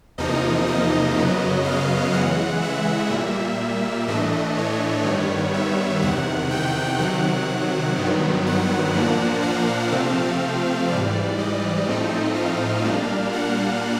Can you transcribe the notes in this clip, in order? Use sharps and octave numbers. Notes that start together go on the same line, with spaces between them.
E2 C3 F3 A#3 D#4 D#5
D#5
F#2 C#3 F#3 B3
F5
C#3 E3 G#3 F#5
E5
A#2 G3 A#3
A2 E3 A3 D4 D#5
C#5
G2 D#3 G3 B3
E5
E2 C3 D#3 F#5
G5
C3 D#3 F#3 F#5
G2 D#3 F#3 B3
F#5
A#2 F3 A#3 D4
F5
C3 F3 A3 C4
G#2 E3 G3 D5
D#5
A2 F3 A3 C4 D#4
F5
A#2 G3 A#3 D4
F#5